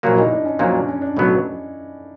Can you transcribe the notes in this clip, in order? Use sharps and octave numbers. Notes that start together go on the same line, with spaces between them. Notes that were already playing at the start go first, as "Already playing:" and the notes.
A#1 A#2 F#3 A#3
E4
D#4
D4
C#4
A#1 A#2 F#3 A#3 C#4
D4
C#4
D4
B1 A2 F#3 B3